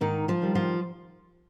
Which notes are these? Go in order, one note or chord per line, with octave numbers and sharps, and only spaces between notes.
G#2 D#3 D#4
F3 F4
D#3 G3
F3 F4